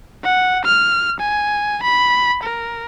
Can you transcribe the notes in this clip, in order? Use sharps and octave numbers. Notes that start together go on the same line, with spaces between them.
F#5
F6
G#5
B5
A#4